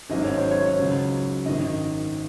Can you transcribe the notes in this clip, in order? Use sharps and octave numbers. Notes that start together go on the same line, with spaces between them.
G#1 G#2 F#3 C#4 D#5
C#5
C5
C#5
C#2 C#3 F#3
G#1 F#2 D#3 D#5